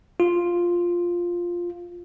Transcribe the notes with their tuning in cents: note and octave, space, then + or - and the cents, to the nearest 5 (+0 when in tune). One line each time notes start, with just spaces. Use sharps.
F4 +0